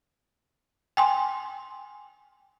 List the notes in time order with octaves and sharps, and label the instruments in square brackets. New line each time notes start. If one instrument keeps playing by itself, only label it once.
[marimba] G5 G#5 C6